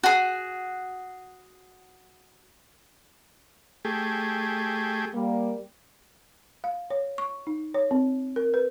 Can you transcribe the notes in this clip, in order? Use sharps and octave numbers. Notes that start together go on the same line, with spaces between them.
F#4 G#4
A3 G4 G#4
G3 A#3
F5
C#5
C#6
D#4
C#5
C4
A#4
B4